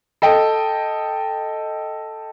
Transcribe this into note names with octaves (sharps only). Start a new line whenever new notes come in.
A4 D#5 G5